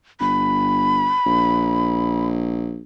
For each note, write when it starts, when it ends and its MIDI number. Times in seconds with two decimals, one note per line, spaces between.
0.20 1.13 31
0.20 2.26 83
1.26 2.84 34